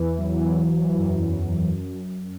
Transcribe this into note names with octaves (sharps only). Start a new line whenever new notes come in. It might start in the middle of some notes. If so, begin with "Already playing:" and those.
Already playing: E2 E3
F#3
E2 E3
E2 E3
F#2
F#2
E2
F#2
E2
F#2